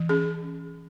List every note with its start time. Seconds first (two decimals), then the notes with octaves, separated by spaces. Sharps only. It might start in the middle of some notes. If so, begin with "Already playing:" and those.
Already playing: E3
0.09 C#4 G#4